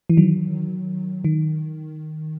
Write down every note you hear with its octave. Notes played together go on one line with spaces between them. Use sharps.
E3
D#3 F#3
D#3